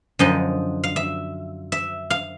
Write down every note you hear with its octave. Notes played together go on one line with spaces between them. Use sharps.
F#2 D3 F3 D#5
F5
E5
E5
F5